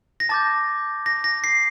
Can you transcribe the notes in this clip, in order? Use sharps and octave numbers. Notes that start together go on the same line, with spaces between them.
A#6
A5 D6 G6 A6
A#6
A#6
C7